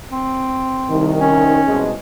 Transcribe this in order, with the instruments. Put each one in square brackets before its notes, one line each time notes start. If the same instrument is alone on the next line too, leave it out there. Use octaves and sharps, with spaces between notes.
[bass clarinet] C4
[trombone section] C2 D#3
[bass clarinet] C#4
[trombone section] C2 B2 G#3